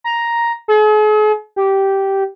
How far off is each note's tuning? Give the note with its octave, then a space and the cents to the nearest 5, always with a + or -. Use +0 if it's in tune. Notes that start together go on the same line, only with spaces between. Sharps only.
A#5 +5
G#4 +45
G4 -10